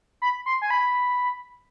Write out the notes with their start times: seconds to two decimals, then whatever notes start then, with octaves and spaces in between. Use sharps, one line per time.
0.22 B5
0.46 C6
0.62 G#5
0.70 B5